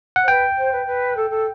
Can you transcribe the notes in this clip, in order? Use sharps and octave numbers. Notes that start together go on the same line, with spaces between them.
F#5
C5
B4 G5
C5
B4
B4
A4
A4